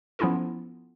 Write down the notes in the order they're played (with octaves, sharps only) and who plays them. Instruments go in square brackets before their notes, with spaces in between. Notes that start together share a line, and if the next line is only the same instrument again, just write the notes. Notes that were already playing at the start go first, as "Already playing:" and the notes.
[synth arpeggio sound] F3 B3 C#4 E4 F4 A4